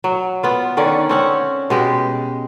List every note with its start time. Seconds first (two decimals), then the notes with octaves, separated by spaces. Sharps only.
0.04 F#3
0.43 B3 F4
0.77 D3 D#3 C#4 D5
1.09 C4 C#4 F#5
1.70 B2 G#3 G4